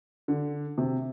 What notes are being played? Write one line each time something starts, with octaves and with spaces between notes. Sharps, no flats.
D3
C3